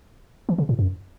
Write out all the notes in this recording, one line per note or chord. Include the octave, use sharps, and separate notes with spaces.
E3
C#3
A2
F#2